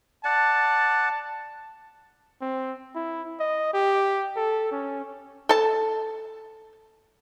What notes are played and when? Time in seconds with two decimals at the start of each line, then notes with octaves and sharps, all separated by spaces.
0.25 D5 F#5 A5
2.42 C4
2.95 E4
3.40 D#5
3.74 G4
4.37 A4
4.72 C#4
5.49 A4 A5